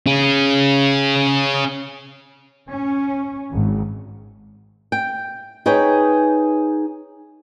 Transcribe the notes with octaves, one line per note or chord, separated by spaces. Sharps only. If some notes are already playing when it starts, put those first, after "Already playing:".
C#4 G#4
C#4
G#1
G5
D#4 G#4 B4 C#5 G5